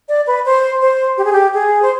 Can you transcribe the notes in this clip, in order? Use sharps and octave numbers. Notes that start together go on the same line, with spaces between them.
D5
B4
C5
C5
G4
G#4
G4
G#4
C5